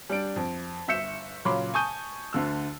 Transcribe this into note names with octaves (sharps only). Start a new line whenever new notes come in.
G3 D4 D7
F2
G1 E5 G6 C#7 E7
A#2 C#3 F#3 B5 C6 D6
G#5 A5 C#6 D#6 G6 D#7
D2 D3 E6